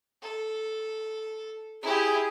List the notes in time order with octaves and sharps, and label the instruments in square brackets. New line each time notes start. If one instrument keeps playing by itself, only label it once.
[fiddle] A4
[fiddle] E4 G4 [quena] G#4